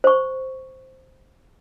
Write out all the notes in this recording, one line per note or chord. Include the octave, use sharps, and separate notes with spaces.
C5 C#6